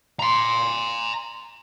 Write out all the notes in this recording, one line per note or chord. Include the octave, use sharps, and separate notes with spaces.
A#5 C6